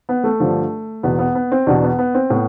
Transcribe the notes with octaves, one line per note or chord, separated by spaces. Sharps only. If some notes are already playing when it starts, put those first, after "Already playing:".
B3
A3
G2 D3 F3
E2 B2 B3
B3
B3
C4
E2 B2 D4
B3
B3
C4
A2 B3